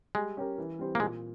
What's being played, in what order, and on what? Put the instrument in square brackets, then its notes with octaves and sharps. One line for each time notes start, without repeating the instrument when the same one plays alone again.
[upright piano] G3 [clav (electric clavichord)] G#3
[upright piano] C#4 G4 A#4
E3
G3 C4
[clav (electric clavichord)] A#3
[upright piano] A#2 [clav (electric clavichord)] G#3